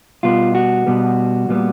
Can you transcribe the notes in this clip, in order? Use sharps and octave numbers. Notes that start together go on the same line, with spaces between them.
B2 G3 B3 F4
F#4
B2 G3 B3
A#2 G3 B3